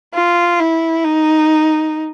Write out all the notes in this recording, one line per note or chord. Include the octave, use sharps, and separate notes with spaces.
F4
E4
D#4